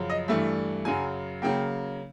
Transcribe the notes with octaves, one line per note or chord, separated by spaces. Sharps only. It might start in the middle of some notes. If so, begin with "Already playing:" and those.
Already playing: F#2 C#3 F3
D#5
G2 E3 A3 D4 E5
F#2 C#3 F#3 G#5
C#3 F#3 A#3 G5